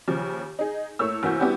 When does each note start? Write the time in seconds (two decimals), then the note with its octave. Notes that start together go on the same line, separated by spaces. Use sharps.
0.08 D#2 C#3 F3
0.59 D#4 G#4
0.99 A2 A3 A#3 C#5 E6
1.23 F1 E3 A#3 F#4 G6
1.39 G3 B3 D4 E4 F#4 G4